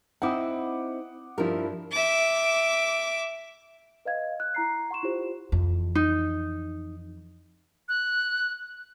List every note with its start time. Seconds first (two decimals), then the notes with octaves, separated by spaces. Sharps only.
0.22 C4 D#4 E4 F#5 D6 D#6
1.38 G2 F3 E4 A#4
1.92 E5 D6
4.05 B4 D#5 F5 G#6
4.40 F#6
4.55 E4 A#5 C7
4.90 F#5 C6 C#6 E7
5.03 E4 F4 G4 C5
5.52 F2 E3
5.95 D#4
7.89 F#6